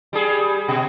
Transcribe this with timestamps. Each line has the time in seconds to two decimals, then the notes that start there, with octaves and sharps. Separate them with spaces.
0.13 G3 G#4
0.68 B2